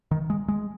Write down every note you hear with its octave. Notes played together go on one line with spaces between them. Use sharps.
D#3
G#3
G#3